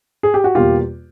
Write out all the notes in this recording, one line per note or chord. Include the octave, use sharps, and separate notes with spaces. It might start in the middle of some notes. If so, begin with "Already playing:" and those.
G#4
G4
F#4
E2 B2 G3 A#3 F4 G4